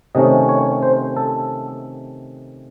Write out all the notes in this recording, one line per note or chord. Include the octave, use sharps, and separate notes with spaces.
C3 D#3 A3 C#4 D#5
C#5
C5
A4